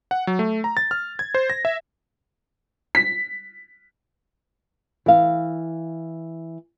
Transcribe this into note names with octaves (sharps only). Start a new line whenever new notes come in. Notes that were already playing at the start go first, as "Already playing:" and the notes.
F#5
F#3
A3
A#5
A6
F6
G#6
C5
A#6
E5
B6
E3 F5